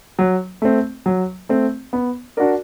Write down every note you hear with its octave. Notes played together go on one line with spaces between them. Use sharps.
F#3
A3 C4
F#3
A3 C4
B3
D4 F#4 A#4 D5